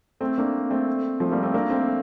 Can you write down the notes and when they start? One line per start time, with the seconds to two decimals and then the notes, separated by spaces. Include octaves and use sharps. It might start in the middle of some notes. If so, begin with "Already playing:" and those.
0.21 A3 C4
0.37 A#3 D4
0.70 A3 C4
1.20 F3 A3
1.32 G3 A#3
1.43 A3 C4
1.54 A#3 D4
1.70 A3 C4